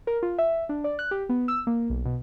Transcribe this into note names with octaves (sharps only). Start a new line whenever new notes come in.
A#4
F4
E5
D4
D5
F#6
G4
B3
E6
A#3
B1
B2